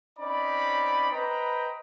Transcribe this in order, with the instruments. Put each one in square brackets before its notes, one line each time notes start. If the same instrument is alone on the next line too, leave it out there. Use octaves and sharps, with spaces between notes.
[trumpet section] C4 C#4 D#4 D5 B5
B4 C5 D#5 G5 A#5 B5